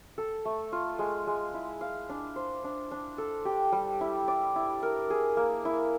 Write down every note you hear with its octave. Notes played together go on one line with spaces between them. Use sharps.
A4
A3
F4
G#3
G#3
E4
F5
D4
C5
D4
D4
A4
G4
G3
E4
D5
E4
A#4
G#4
A#3
E4